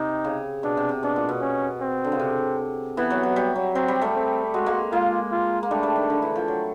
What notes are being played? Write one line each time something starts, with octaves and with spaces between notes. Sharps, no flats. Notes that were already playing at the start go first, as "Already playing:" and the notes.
Already playing: C3 D#4
C#3
B2 D4
C3
C3
B2 D4
A#2
B2
C#4
C4
D3
C#3
C3
E3 B3
F#3
F#3
G3
F#3
F#3 C4
G3
G3 A3
C4
G#3 F#4
G#3 A#3
G#3 A#3 F4
F4
A#3
G3 A3 D4
G3 A3
D#3
D3
E3
F3
F#3